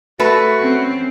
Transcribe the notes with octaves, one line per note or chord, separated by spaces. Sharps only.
A3 F#4 B4
C4 C#4